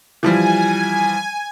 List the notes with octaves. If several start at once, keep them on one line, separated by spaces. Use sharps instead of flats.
E3 F3 G3 G#5